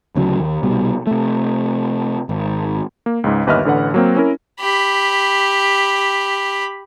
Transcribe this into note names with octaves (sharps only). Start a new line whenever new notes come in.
D2 C#3 F3 F#3
D#2
C2 B2 G3
C3 A3
G#1
A#3
C#2 G#2
G1 D#2 B4 D#5 E5 F6
A1 D3 B4 F#5
F#3 A#3 C4
C#4 E4 A#4
G4 B5